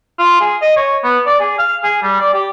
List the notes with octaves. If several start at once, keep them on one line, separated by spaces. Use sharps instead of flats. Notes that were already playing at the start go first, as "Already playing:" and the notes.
F4
G#4
D#5
C#5
B3
D5
G#4
F5
G#4
G3
D5
G4